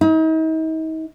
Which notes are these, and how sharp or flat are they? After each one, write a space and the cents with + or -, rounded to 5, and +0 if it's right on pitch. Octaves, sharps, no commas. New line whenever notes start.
D#4 +40